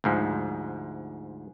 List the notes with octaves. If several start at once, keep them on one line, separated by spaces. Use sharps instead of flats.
D2 G#2 F3